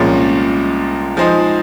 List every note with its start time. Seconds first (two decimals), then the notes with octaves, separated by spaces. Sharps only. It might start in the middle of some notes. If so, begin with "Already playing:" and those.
Already playing: C2 A#2 F3 G#3 C#4
1.17 F3 G#3 D#4 G#4 C5